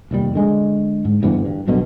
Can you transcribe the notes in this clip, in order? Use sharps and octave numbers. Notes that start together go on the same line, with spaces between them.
F1 D#2 G3
D3 G#3
G#2
D2 G2 E3 B3
G2
B1 G2 B2 D3